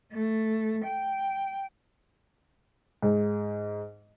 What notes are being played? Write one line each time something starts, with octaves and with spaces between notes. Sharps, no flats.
A3
G5
G#2